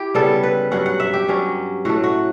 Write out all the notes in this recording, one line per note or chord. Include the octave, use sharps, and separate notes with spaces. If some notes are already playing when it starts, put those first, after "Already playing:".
Already playing: E4 G4
C#3 G3 B3 A4
B4
G2 F#3 C#4 F#5
F#5
E5
G4
G2 F#3 C#4
A2 F#3 A3 F#4
F#4